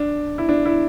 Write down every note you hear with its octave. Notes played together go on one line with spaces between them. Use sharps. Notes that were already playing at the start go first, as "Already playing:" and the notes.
Already playing: D4
E4
D4
E4